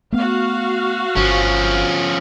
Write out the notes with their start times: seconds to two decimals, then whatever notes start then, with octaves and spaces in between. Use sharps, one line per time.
0.12 A3 B3 F#4 F5
1.17 G1 F3 C#4